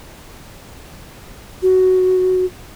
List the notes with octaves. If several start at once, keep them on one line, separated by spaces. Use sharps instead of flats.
F#4